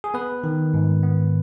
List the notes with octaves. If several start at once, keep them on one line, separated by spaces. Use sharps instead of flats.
G#4
B3 B4
D#3
G#2
B3